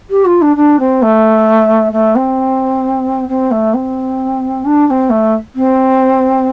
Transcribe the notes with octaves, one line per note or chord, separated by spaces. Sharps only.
G4
F4
D4
D4
C4
A3
A3
C4
C4
A3
C4
D4
D4
C4
A3
C4